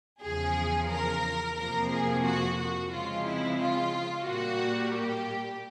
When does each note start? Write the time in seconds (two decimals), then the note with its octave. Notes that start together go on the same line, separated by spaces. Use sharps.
0.22 E2 C#3 F3 G#4
0.90 A#4
1.57 F2 C3 F3 A#3 A#4
1.91 G#4
2.25 F#4
2.58 F#4
2.92 C#3 F3 G#3 C4 F4
3.26 E4
3.59 F4
4.27 A#2 G3 A#3 F#4
4.94 G4